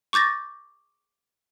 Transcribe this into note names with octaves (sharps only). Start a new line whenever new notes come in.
C#6 D6 G6 A6 A#6